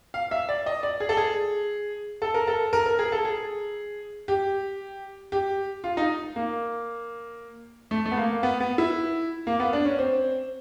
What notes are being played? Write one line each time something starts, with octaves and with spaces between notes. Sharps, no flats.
F5
E5
D5
D#5
D5
G#4
A4
G#4
A4
A#4
A4
A#4
A#4
G#4
A4
G#4
G4
G4
F4
D#4
A#3
A3
A3
B3
A#3
B3
B3
E4
A#3
B3
D4
C#4
C4